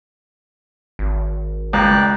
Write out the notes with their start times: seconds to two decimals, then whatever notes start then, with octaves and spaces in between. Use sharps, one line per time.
0.99 G#1
1.73 C#2 D5 G5 A#5 F#6